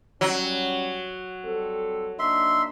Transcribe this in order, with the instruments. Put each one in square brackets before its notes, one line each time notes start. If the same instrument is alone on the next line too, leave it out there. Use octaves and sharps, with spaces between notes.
[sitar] F#3 [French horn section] G3 C#4
[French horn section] G3 C4 A4
[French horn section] A#3 D4 D#4 [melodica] E5 C6